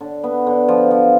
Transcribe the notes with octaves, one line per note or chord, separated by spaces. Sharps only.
D3
B3
D3
F3
F3